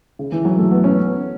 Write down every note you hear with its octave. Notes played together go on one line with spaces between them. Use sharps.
C#3
E3
F#3
A3
B3
C#4